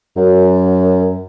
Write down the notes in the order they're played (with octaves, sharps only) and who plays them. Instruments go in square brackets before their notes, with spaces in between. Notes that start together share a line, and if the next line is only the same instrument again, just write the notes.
[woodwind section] F#2